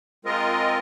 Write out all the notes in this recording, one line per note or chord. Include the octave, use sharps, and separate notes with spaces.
G#3 C4 F4 A#4 D#5